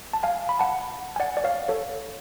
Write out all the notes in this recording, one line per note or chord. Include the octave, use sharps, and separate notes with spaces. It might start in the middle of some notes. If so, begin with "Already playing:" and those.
A5
F5 G#5
B5
F#5 A5
G#5
D5 F#5
D5
C#5 F5
A4 C#5